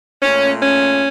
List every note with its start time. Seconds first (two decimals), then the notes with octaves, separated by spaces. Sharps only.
0.22 A#2 A3 C#4
0.62 C#4